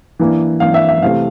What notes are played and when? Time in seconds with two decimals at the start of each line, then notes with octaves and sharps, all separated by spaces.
0.19 E3 A#3 D4
0.60 E3 A#3 D4 F5
0.74 E5
0.89 E5
1.02 C3 E3 A3 C4 F5